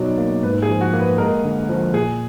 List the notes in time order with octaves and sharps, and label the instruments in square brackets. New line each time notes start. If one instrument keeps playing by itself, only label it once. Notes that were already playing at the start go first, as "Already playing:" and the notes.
Already playing: [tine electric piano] B2 F#3 D#4 [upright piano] D5
[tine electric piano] A#3
[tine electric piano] G#2 [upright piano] B4
[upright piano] G#4
[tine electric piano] F3
[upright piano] F#4
[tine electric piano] A#3
[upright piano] B4
[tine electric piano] G#3 [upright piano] A#4
[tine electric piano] D3
F3
[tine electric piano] A#2 [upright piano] G#4